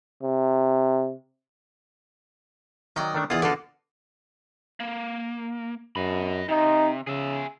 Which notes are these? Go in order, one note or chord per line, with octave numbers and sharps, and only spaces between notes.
C3
D#3 F#3 D5 D#5 G5
D#3 A3 D4
E2 E3 F4 D5 D#6
D3 B3 F4 F#4 A4 D5
A#3
F#2 D#5 B5
C3 D#4
C#3 G#4 E5